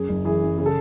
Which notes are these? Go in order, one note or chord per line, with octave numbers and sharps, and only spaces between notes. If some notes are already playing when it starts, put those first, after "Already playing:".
Already playing: F#2 G#4
F#1
E3 G#4
F#2
C#3 G#4
A4